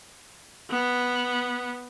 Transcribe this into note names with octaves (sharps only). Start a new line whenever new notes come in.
B3